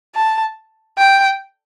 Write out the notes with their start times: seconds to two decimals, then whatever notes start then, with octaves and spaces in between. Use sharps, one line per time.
0.15 A5
0.98 G5